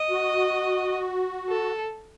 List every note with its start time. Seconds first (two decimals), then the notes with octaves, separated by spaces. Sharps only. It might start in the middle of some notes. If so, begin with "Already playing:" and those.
Already playing: D#5
0.10 F#4
1.49 A4